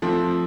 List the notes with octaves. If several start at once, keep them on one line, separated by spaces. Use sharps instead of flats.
F3 A3 C4